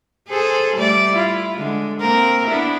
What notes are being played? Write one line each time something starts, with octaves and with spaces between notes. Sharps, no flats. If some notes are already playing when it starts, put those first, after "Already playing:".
G#4 A4 C5
G3 A3 D5
E4 F4
D3 G#3
A#3 C4 A#4
B3 D4 E4